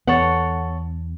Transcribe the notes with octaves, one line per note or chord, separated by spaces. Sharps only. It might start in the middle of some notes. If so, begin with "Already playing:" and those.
E2 B3 A4 C#5 F#5